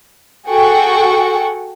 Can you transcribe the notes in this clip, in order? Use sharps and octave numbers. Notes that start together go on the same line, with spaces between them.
F#4 G#4 A4 F#5 G5 C#6